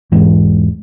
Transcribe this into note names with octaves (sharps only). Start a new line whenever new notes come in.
E1 G#2 E3 G#3